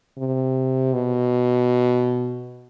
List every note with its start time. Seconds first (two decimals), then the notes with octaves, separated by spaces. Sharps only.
0.18 C3
0.93 B2